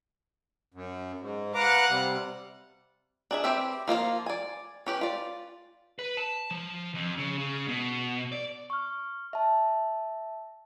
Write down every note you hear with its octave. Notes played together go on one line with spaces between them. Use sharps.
F#2
G#2
B4 F5 F#5 A#5 D6
C3 G3
D4 G#4 E5
C4 G4 B4 E5
F3 A#3 F4 F5
D5 G#5
C#4 G4 B4
F4 D5
B4
A5
F3
F2
C#3
C#3
B2
D5
C#6 F6
E5 A5